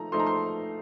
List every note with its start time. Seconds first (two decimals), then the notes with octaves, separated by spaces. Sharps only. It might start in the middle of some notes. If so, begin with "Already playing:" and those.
Already playing: F3 A3 D#4 A#5
0.12 F3 A3 D#4 C6
0.20 A#5
0.26 C6